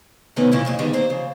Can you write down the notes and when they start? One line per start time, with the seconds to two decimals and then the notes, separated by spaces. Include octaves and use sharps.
0.36 C3 D#3 E3 A3 B3 C#4
0.51 A#2 C#3 A3 E4
0.65 F2 C#3 A#3
0.78 D3 D#3 G3 G#3 B3
0.93 A#3 C4 C5
1.10 C#3 F3